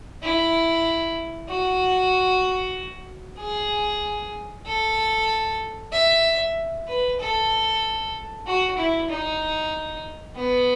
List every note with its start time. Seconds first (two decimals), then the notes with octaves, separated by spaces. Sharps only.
0.23 E4
1.49 F#4
3.39 G#4
4.66 A4
5.93 E5
6.88 B4
7.20 A4
8.47 F#4
8.78 E4
9.10 D#4
10.36 B3